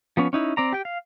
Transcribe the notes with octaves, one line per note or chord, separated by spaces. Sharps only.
F3 B3 C#4
C#4 D#4 E4
C4 D5 A#5
G4 G5
F5